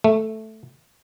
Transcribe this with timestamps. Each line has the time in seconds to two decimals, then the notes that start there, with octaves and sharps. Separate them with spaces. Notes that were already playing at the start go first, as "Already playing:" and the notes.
0.04 A3